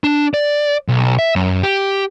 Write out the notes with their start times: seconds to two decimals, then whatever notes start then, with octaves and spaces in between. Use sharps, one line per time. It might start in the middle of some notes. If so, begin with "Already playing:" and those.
0.04 D4
0.34 D5
0.88 B1
1.19 E5
1.36 F#2
1.63 G4